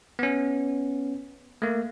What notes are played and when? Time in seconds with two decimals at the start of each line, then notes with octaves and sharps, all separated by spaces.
0.19 B3 C#4
1.62 A3 A#3